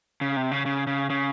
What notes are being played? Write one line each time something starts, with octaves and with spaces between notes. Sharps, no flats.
C#3
C3
C#3
C#3
C#3
C#3